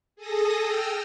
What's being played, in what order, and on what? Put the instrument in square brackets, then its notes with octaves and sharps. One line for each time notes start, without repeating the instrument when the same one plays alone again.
[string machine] G#4 A4 D#6 A#6
G5 E6 F6